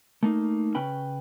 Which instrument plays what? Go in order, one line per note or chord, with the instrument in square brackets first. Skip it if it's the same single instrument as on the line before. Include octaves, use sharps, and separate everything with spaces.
[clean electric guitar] A3 A#3 D#4
C#3 C#4 B4 G5 B5